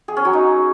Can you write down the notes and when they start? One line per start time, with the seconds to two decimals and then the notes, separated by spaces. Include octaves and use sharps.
0.08 G#4
0.17 C#4
0.25 F#3
0.33 D#4